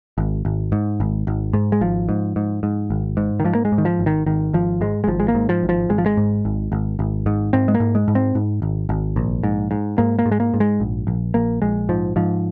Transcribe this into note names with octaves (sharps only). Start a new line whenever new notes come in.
G#1
G#1
G#2
G#1
G#1
G#2
G#3
G#1 F3
G#2
G#2
G#2
G#1
G#2
D#3
G#2 F3
A#3
G#3
G#2
D#3
F3
G#1
D#3
G#1 D#3
G#1 F3
G#2 G#3
G#3
G#1 F3
G#3
A#3
G#2
F3
G#1
F3
G#1 G#3
F3
G#3
G#2
G#1
G#1
G#1
G#2
G#2 C4
G#3
A#3
G#2
G#3
G#2
C4
G#2
G#1
G#1
A#1
G#2
G#2
G#2 A#3
A#3
G#2
G#3
A#3
G#2
G#3
A#1
A#1
A#1 A#3
A#1 G#3
G#2 F3
G#2 F3